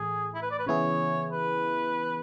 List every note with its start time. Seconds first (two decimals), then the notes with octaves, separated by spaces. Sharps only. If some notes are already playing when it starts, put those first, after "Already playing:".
Already playing: A2 E3 A3 G#4
0.35 E4
0.42 B4
0.51 D5
0.59 B4
0.67 C#3 E3 B3 E4 G#4 C#5
1.32 B4